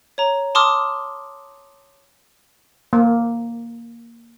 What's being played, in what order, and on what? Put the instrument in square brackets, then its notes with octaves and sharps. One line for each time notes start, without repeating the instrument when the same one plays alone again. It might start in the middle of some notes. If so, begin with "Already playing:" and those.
[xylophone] C#5 A#5
A5 C6 D6 D#6 F6
[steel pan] A#3